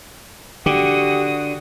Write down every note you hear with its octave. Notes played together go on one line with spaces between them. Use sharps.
D3 F#4 G4 D#6